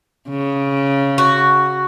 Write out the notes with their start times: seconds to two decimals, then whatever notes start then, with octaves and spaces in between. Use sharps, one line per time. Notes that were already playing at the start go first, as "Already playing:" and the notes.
0.29 C#3
1.18 F#4